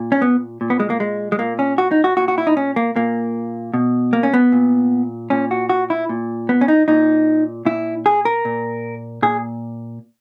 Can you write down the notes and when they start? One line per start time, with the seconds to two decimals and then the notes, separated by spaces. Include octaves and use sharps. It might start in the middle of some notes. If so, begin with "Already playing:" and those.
Already playing: A#2
0.12 C#4
0.22 B3
0.61 A#2
0.70 B3
0.80 G#3
0.90 A#3
1.00 G#3
1.32 G#3
1.39 A#2 A#3
1.59 C#4
1.78 F#4
1.91 D#4
2.04 F#4
2.17 A#2 F#4
2.28 F#4
2.38 E4
2.47 D#4
2.57 C#4
2.76 A#3
2.96 A#2 A#3
3.74 B2
4.13 A#3
4.23 C#4
4.34 B3
4.52 A#2
5.30 A#2 C#4
5.51 F#4
5.69 F#4
5.90 E4
6.09 A#2
6.49 B3
6.61 C#4
6.68 D#4
6.88 A#2 D#4
7.65 A#2 E4
8.06 G#4
8.25 A#4
8.45 A#2
9.22 A#2 G#4